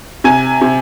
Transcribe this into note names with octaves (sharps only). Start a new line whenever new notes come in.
C3 G#5
C3